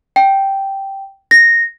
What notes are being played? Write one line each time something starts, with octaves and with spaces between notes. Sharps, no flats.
G5
A#6